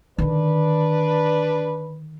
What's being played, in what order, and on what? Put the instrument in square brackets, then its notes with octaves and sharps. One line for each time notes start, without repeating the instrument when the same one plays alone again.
[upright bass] D3 D#3 [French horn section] D4 B4